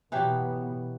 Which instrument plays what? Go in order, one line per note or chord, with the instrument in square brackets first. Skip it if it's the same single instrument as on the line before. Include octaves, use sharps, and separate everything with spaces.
[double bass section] B2 B3 [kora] E3 F#3 G4